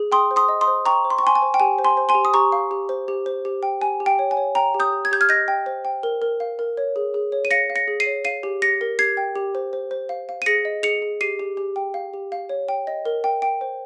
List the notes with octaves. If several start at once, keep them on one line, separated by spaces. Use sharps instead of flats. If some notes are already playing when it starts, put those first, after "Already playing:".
Already playing: G#4
G5 C6 D#6
C5
C6 D#6
D#5
C6 D#6
C5
G5 A#5 C#6
C5
C6
C#6
G5 G#5 C6
G#5
C5
G5
G4 G#5
C5
G#5 C6
C5
G#5 C6
G4
D#6
G4 A#5 C#6
F5
G4
C5
G4
C5
G4
G5
G4 G#5
G4
G5
C#5
G#5
C#5
G5 A#5
G4
D#6 G6
G4
G#6
G4 G6
F6 G#6
D#5 G6 A#6
G5
C5
G5
A#4
A#4
F5
A#4
C#5
G#4
G#4
C#5
D#7
F5 A#6 C#7
F5
A#6 C#7
G#4
C7 D#7
C#5
F5 C7 D#7
G4
G4 A#6 C#7
A#4
G4 G#6 C7
G5
G4
C5
C5
C5
F5
F5
D#7
G#4 A#6 C#7
D#5
G#4 C#7 F7
G#4
G4 C7 D#7
G4
G4
G5
F5
G4
F5
C#5
G5
D#5
A#4
G5
G5
C5